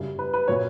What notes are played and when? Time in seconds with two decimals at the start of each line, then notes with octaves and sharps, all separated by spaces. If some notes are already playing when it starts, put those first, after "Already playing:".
Already playing: F#2 C#3 G3
0.19 B4
0.33 B4
0.48 A#2 F#3 A#3 C#5